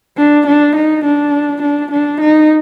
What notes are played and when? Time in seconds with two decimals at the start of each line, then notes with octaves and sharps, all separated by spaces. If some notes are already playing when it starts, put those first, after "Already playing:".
0.18 D4
0.47 D4
0.75 D#4
1.05 D4
1.62 D4
1.91 D4
2.20 D#4